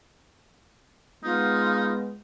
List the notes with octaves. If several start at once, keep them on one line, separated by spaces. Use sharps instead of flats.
G#3 B3 D#4 F4